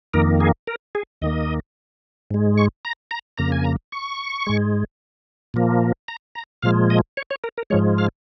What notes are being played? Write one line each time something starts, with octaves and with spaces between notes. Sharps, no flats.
F2 D#3 A#3 A#4
G#4
A#4
G#4
D#2 D#3 A#3 D#5
G#2 G#3
C#6
A#5
A#5
F2 C#3 A#3 A#5
G#5
A#5
C#6
G#2 G#3
A#2 F3 A#3
A#5
A#5
A#2 F3 G#3 F5
D#5
C#5
C#5
A#4
A#4
G#2 F3 G#3 C#5
F5